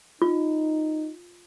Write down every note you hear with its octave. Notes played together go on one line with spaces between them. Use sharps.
D#4 F4